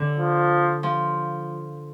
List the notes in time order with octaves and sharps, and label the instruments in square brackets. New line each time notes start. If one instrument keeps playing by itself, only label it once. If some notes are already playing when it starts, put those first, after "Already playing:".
Already playing: [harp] D3
[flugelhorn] F3
[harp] F3